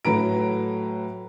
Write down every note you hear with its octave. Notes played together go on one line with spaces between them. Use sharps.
A2 F#3 B4 A#5 D7